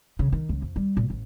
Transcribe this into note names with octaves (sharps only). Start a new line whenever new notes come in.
C#3
D#3
C#2
F2
G3
A#2
A1